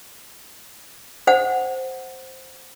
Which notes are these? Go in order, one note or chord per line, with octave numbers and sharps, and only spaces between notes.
C5 F#5